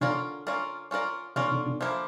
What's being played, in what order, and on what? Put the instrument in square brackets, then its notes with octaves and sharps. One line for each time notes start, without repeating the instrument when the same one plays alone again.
[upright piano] D3 D4 [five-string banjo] C#4 F4 A#4 D5
[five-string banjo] C#4 F4 A#4 D5
C#4 F4 A#4 D5
[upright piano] D3 D4 [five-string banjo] C#4 F4 A#4 D5
[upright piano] D3 D4
D3 D4
[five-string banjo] F3 A#3 E4